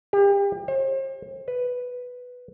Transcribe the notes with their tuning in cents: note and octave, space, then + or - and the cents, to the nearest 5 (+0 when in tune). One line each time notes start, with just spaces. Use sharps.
G4 +35
C5 +40
B4 +0